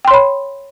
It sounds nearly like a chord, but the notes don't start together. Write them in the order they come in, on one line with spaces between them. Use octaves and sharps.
G5 C6 C#5 B5